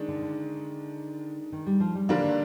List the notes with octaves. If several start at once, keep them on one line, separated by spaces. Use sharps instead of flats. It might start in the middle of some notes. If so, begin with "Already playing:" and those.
Already playing: D#3 G#3 D4
D3
D3
D#3
G3
F3
G3
D3 F3 G3 A#3 D4
D#3